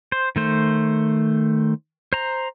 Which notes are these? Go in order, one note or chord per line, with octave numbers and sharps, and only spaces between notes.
C5
D#3 A3 C5
C5 A#5